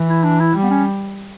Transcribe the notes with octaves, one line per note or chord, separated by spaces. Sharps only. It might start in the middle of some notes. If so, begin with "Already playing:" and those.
Already playing: E3
E4
D4
E4
G3
B3
C#4